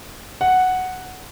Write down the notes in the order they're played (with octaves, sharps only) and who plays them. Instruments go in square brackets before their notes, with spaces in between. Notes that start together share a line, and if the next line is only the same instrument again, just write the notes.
[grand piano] F#5